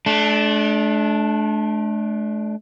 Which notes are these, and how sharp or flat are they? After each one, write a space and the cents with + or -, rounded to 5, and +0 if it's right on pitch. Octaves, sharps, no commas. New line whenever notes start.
A3 -40 D4 +0